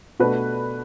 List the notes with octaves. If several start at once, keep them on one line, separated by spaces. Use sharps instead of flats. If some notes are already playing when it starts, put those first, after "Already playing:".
B2 A3 D4 F#4 B4